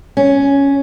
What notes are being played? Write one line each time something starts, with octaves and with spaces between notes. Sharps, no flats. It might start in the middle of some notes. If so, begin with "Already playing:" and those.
C#4